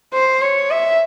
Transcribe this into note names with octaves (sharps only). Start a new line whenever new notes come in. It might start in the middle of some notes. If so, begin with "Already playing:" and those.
C5
C#5
E5